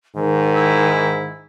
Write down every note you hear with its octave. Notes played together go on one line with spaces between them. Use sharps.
G#2 D#3
E4